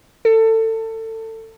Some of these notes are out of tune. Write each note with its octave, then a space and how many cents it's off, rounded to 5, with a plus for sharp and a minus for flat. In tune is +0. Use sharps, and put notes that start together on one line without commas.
A4 +25